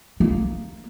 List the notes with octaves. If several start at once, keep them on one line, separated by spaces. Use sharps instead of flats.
A#3